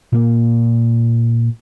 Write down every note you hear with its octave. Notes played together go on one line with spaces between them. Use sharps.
A#2 A#3